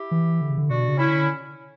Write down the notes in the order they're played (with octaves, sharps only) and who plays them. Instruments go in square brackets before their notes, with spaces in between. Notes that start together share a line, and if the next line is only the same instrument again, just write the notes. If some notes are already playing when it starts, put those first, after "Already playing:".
Already playing: [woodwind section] E4 G4
[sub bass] E3
D3
C#3
D3
[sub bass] B2 [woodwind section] D4 F#4
[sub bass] C#3
[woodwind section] C#4 E4
[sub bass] D3